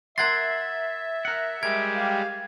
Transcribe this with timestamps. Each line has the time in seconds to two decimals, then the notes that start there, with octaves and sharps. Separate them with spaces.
0.18 A#4 E5 F#5 C6 G#6 A6
1.25 A#4 F#5
1.63 G3 G#3 A#4 G#6
1.96 G4 F5